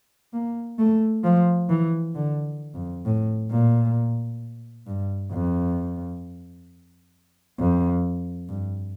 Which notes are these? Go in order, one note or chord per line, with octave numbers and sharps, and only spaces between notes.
A#3
A3
F3
E3
D3
F2
A2
A#2
G2
F2
F2
G2